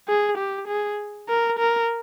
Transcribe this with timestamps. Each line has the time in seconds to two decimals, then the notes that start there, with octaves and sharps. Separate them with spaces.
0.08 G#4
0.38 G4
0.68 G#4
1.29 A#4
1.59 A#4